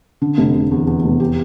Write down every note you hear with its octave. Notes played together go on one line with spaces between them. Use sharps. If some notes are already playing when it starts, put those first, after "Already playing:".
D3
F1
F1
E2
E2
F1
G4